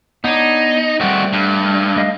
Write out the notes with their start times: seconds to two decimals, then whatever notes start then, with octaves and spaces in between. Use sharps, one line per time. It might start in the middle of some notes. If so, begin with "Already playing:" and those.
0.24 B3 D4 D#4 C#5
1.01 G3 A3 C4 F#4
1.33 G2
1.96 A3 D#5 F5